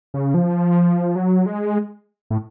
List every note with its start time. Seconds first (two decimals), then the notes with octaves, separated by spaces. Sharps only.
0.14 C#3
0.34 F3
1.16 F#3
1.46 G#3
2.30 A2